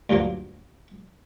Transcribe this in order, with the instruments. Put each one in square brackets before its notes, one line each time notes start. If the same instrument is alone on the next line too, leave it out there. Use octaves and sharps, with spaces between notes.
[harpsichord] D2 G2 F3 F#3 A#3